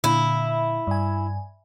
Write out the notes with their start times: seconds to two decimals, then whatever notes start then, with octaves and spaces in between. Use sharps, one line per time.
0.04 A#2 D3 E4
0.87 G2 G#5